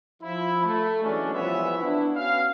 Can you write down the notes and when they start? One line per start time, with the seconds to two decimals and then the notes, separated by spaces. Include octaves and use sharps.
0.23 F3 E4
0.64 A3
1.03 E3 F#3 G#3 C#4 D4
1.34 C2 E3 F3 B3 C#5 E5
1.78 B3 D4 E4
2.15 B3 C#4 F#4 F5